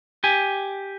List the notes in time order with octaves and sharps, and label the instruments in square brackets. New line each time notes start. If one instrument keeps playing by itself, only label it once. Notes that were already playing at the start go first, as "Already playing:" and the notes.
[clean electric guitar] G4 G#5